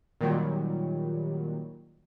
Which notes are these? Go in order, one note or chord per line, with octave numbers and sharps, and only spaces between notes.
A#2 D#3 F#3 G3